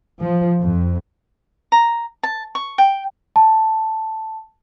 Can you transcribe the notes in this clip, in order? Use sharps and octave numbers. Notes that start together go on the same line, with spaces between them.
F3
F2
A#5
A5
C#6
G5
A5